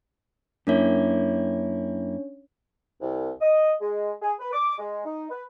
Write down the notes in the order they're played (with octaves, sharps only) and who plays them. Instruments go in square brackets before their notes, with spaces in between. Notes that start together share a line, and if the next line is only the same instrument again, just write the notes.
[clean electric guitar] F#2 A#3 E4 [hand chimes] C#4 D4 C#5
[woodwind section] C2
D#5
G#3
G#4
B4
D6
G#3
D#4
B4